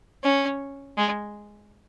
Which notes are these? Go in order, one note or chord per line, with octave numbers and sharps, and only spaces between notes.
C#4
G#3